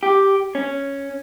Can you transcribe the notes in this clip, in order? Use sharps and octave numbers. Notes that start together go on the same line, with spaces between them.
G4
C#4